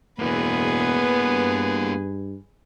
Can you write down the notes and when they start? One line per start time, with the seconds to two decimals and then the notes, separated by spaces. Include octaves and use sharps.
0.19 E1 A#3 B3 E4 G#4 B4
1.21 G2